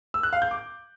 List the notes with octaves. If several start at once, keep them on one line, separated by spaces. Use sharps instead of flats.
E6
F#6
F5
G6
D6